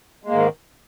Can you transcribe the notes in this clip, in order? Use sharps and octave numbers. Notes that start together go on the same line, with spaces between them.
G#2 D#3 G#3 A#3